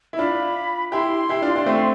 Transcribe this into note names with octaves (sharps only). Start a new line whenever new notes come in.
E4
D4 F4 B5
E4 G4 C6
E4 G4
D4 F4
D4
A3 C4